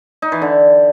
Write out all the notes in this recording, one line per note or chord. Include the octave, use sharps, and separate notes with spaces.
D#4
E3
D3